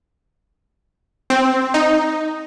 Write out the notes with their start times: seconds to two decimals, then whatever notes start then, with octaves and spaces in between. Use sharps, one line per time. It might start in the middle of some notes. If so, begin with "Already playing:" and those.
1.30 C4
1.74 D#4